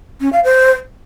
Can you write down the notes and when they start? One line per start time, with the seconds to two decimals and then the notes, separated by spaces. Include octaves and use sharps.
0.21 C#4
0.33 F5
0.44 C5